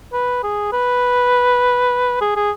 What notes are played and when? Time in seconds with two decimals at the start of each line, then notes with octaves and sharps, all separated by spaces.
0.13 B4
0.43 G#4
0.72 B4
2.21 G#4
2.36 G#4